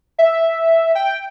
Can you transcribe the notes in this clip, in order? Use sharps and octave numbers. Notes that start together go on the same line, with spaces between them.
E5
G5